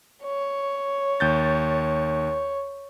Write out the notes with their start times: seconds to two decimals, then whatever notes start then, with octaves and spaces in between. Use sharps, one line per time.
0.24 C#5
1.20 D#2 G6 A6